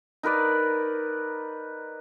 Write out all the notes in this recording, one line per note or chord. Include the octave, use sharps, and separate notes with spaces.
D#4 A#4 B4 D5